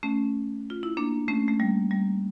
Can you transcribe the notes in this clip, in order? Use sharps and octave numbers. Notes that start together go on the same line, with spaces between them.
A3 C#4
F4
E4
A#3 D4
A3 C#4
A3
G3 A#3
G3 A#3